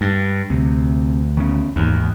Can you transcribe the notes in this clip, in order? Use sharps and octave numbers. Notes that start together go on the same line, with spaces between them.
G2
D2 C3
D#3 B3 C#4
G#1 D#2 G#2 E3